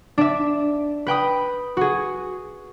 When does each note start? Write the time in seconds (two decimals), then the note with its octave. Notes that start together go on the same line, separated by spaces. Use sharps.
0.18 D4 D5 E5
1.07 B4 G5 B5 D#6
1.77 F#4 G#4